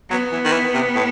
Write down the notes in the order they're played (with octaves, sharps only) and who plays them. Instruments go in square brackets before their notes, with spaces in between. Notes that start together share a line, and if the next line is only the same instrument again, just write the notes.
[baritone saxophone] F#3 [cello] B3
[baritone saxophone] E3
D#3
E3
C3
A2